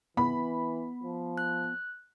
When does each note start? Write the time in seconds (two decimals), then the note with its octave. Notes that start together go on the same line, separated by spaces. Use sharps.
0.17 E3 B3 B5
1.04 F3
1.38 F#6